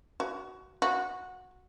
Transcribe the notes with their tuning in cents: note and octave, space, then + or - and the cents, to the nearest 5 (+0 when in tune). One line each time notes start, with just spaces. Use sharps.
F#4 +15
F#4 -15